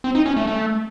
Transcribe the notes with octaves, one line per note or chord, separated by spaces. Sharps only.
C4
D#4
C#4
A3
A3